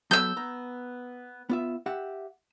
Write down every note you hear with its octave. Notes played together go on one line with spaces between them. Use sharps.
F#3 B3 A4 E6 G6
B3 A#5
B3 F4 E5
G4 E5 F#5